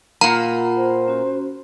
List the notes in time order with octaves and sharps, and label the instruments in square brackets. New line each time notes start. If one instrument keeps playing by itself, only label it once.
[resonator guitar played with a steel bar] A#2 A#3 [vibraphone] F4 F#5 B5 [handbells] A#5
[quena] C5
[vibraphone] C#4 F#4